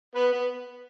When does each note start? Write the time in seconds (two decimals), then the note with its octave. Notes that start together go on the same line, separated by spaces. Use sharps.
0.15 B3 B4
0.32 B3